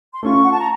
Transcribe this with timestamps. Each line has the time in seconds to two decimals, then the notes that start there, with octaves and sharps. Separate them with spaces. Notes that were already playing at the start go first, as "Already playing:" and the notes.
0.13 C6
0.22 A3 C#4 F4 C#6
0.44 F#5
0.52 A5
0.60 A#5